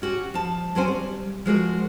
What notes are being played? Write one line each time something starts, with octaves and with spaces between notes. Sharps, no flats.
C#4 F#4 G4
F3 A5
F#2 F#3 C4 C#4 C5 G#5
G3
F3 G#3 F#4 A#4